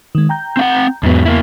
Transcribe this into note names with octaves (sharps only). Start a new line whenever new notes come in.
D#3 G#3
G5 A#5 G6
C4 F5 F#5
E2 G#2 F#3 B3
A#3 E4